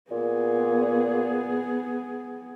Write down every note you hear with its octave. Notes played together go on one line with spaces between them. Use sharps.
A#2 B3 G#4